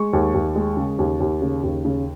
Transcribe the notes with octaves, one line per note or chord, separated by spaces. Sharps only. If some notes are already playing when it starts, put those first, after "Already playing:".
Already playing: G#3 C#6
D#2
D#2
G#3
C#3
D#2
D#2
C#3
D#2
C#3